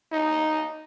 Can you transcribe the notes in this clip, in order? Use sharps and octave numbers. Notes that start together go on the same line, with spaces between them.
D#4